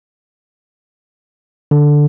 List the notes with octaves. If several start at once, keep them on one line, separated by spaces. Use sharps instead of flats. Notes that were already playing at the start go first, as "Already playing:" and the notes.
D3